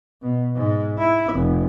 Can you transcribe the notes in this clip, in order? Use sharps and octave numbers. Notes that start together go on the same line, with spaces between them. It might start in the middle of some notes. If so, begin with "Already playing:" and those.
B2
G#2
E4
F1